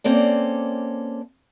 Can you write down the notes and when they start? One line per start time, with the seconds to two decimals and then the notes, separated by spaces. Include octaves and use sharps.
0.04 A#3 C4 C#4 A4 D5